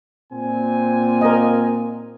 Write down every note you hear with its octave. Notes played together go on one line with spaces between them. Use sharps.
A#2 C4 G#5
A#4 D#5